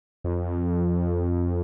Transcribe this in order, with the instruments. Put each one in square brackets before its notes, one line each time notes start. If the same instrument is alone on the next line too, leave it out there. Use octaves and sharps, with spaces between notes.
[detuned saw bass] F2